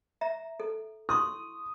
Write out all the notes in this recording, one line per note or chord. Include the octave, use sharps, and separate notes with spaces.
E5 A#5
A4
E4 C6 C#6 D#6